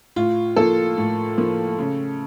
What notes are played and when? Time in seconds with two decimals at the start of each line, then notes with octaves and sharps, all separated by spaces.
0.16 A2 F4
0.56 F3 A#3 A4
0.97 A2
1.38 F3 A#3
1.78 C#3